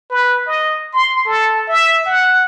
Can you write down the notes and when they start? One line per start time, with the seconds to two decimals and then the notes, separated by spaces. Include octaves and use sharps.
0.11 B4
0.47 D#5
0.93 C6
1.26 A4
1.69 E5
2.06 F#5